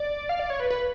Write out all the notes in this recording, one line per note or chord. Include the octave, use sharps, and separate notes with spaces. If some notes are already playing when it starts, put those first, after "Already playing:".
Already playing: D5
F5
D5
C#5
B4
B4